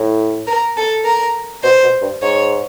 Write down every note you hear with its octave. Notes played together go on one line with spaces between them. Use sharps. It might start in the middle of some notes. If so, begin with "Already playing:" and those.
Already playing: A2
A#4
A4
A#4
B2 C5
B2
G2
G#2 C#5